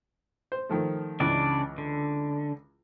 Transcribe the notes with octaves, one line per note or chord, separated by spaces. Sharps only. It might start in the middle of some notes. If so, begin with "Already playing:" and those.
C5
D#3 F3 A3
C#2 C#3 E3 D4 D5
D3